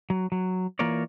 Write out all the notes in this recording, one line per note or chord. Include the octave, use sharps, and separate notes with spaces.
F#3
F#3
E3 A#3 F4 A#4 C#5 D5